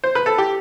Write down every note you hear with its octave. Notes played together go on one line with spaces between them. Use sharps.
C5
B4
A4
G4